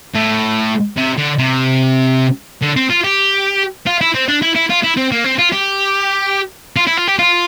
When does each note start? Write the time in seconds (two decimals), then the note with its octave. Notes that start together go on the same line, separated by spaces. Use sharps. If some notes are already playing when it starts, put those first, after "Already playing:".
0.14 A2
0.97 C3
1.18 D3
1.38 C3
2.62 D3
2.77 C4
2.90 F4
3.04 G4
3.87 F4
4.01 E4
4.14 C4
4.28 D4
4.42 E4
4.55 E4
4.70 F4
4.83 E4
4.97 C4
5.12 A#3
5.24 C4
5.39 F4
5.53 G4
6.76 F4
6.87 E4
6.98 F4
7.08 G4
7.19 F4